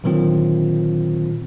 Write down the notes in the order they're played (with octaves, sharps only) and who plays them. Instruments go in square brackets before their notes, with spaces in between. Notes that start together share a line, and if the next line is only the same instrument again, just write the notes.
[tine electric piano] A#2 D3 D#3 F#3 C4 F4